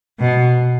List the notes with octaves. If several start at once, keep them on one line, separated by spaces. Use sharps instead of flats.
B2